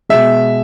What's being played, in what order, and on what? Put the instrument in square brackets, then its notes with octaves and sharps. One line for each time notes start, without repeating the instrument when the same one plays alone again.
[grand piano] B2 G#3 E5